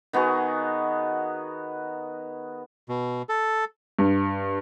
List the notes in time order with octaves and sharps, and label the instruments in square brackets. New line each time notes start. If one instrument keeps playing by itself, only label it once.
[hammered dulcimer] D#3 B3 F#4 G#4
[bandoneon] B2
A4
[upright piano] G2